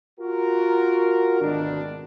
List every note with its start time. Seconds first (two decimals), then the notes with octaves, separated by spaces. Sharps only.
0.19 F4 F#4 A#4
1.41 G#1 D2 B2 D#3 D4